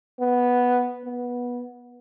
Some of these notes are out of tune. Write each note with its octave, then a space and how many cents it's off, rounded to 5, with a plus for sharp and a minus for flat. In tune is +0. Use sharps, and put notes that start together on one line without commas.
B3 -5
B3 -15